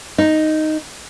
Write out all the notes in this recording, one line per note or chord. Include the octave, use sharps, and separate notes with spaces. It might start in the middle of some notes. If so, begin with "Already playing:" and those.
D#4